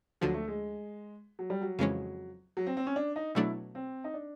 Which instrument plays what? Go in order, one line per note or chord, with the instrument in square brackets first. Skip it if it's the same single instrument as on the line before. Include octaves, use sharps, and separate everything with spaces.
[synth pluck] D2 D3 F3 [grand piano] F#3
[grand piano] A3
G#3
F#3
G3
F#3
[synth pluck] F2 C#3 E3 G#3 C#4
[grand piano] F#3
C4
C4
C#4
D4
D#4
[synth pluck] B2 F#3 A3 D4 [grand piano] E4
[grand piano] C4
D#4
D4